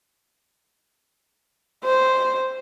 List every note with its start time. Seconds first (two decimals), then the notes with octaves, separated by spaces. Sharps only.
1.84 C5